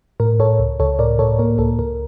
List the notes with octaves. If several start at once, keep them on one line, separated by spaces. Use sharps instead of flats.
A2 A#4
A2 A4 C#5
C#2
C#2 A4 C#5
A2 A#4 D5
A2 A4 C#5
A#3 A#4
C#2 A4
C#2 A#4